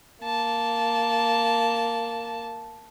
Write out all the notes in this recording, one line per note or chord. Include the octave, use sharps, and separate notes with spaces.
A#3 A5